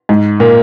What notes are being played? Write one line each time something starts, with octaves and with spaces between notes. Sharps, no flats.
G#2
A#2